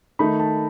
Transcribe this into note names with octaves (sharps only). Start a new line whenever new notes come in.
D#3 A3 D#4 B5
A5